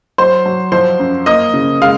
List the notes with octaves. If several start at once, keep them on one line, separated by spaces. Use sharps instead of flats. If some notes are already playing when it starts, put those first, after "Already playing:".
F#3 C5 C6
F#3
F3 C5 C6
F#2
A#3 D#5 D#6
C#3
G#3 F5 F6